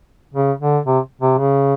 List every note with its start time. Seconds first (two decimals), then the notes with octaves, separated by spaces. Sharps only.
0.34 C#3
0.60 D3
0.86 C3
1.22 C3
1.38 C#3